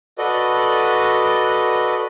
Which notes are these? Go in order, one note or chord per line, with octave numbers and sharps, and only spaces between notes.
F#4 A4 B4 D5 D#5